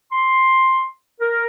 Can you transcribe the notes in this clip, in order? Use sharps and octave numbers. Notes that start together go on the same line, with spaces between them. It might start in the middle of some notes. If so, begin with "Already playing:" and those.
C6
A#4